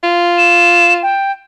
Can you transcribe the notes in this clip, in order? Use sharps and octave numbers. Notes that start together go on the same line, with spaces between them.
F4
E7
G5